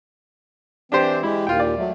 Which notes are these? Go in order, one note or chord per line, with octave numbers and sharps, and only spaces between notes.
E3 C4 D4 G4 C5
G#3 E4 G4
D#2 A#2 F4 G5
D5
F#3 A3